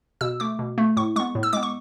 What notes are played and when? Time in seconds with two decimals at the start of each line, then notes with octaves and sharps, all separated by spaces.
0.21 B2 E6
0.40 A3 D6
0.59 B2
0.78 A3
0.97 A2 C#6
1.16 G#3 B3 C#6
1.35 A2
1.43 E6
1.53 G#3 B3 D6
1.63 C#6